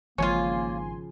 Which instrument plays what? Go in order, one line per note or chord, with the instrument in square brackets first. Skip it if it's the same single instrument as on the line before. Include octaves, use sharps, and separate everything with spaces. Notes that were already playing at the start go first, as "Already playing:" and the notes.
[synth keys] G#1 G#5 C6 [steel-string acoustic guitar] C#3 F3 [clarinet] A#3 [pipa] C#4 F4